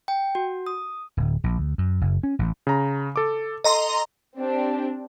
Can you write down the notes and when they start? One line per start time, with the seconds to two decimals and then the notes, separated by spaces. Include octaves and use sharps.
0.08 G5
0.35 F#4
0.67 D#6
1.17 D1
1.44 A#1
1.58 D2
1.78 F#2
2.01 F#1
2.23 C#4
2.39 A1
2.67 C#3 A#5
3.16 A4 D6
3.64 A4 D#5 A#5 C6
4.37 C4 D4 G4